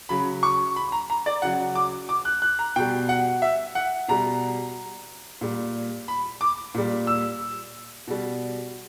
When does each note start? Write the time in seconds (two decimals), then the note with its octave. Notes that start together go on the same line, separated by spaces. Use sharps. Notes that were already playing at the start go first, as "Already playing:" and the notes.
0.09 C#3 F#3 B5
0.43 C#6
0.76 B5
0.92 A#5
1.10 A#5
1.26 D5
1.42 C#3 F#3 F#5
1.75 D6
2.09 D6
2.25 F#6
2.42 F#6
2.59 A#5
2.76 B2 G3 G5
3.09 F#5
3.42 E5
3.75 F#5
4.08 B2 G3 A#5
5.41 A#2 G3
6.08 B5
6.41 D6
6.74 A#2 G3
7.07 E6
8.07 B2 G3